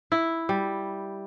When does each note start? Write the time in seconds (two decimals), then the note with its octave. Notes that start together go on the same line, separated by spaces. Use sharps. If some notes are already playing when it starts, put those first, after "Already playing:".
0.12 E4
0.49 G3